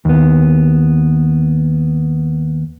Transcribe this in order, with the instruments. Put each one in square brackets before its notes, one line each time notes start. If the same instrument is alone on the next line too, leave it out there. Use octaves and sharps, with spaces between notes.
[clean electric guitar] D#2 B3